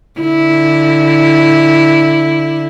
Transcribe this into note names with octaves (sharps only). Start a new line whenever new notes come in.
D3 E4